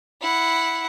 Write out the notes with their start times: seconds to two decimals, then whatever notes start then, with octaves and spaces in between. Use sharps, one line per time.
0.21 E4 F#5